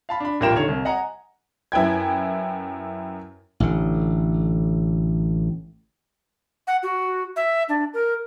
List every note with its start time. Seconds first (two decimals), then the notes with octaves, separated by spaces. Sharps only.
0.09 F5 A5 B5
0.20 D4 B5
0.40 D#1 A1 F4 A#4 G5 E7
0.56 D3 D#3 C#5 G#6 F7
0.68 C2
0.85 D#5 F#5 G#5 A#5
1.72 F#2 E4 B4 G5 G#6
3.60 A1 D3
6.67 F#5
6.83 F#4
7.36 E5
7.69 D4
7.94 A#4